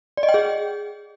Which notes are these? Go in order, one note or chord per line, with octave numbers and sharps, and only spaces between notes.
D5
D#5
G5
G#4